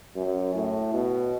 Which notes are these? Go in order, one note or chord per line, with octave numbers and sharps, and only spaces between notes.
F#2
A2
B2